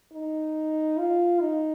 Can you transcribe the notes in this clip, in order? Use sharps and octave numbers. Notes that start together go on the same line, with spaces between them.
D#4
F4
D#4